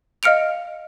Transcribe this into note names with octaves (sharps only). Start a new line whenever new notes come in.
D#5 F5 F6 C#7 D7 F7